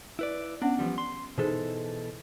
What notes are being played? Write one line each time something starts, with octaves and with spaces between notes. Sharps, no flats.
E4 B4 D5
B3 C#4 D4 F#5
E3 F3 G3
C6
B2 E3 D#4 G#4 A4 C5